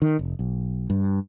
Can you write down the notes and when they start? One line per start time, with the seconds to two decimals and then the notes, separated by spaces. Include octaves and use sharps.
0.02 D#3
0.19 F1
0.39 B1
0.90 G2